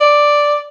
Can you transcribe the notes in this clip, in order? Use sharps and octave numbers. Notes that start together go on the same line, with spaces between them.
D5